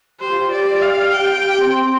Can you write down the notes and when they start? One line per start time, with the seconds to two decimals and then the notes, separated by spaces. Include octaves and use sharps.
0.20 G4 C5
0.31 F4
0.41 G4
0.52 D5
0.82 F5
1.14 G5
1.44 G4
1.60 C4